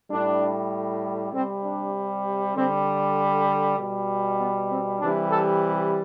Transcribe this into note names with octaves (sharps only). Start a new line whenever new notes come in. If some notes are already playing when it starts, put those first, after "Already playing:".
A2 G3 D4
C3 G3 C4
D4
D3 G3 C4
B2 G3
B3
C4
C3 E3 G3 D4
A4